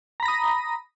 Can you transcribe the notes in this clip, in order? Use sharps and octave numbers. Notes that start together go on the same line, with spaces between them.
A#5 B5 D#6 A#6